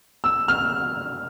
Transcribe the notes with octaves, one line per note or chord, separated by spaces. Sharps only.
E6
F6